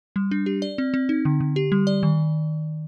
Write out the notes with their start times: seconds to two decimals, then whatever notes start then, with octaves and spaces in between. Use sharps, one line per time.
0.16 G3
0.31 D4
0.46 G4
0.62 D5
0.78 C4
0.94 C4
1.09 D#4
1.25 D3
1.40 D3
1.56 G4
1.72 G3
1.87 D5
2.03 D#3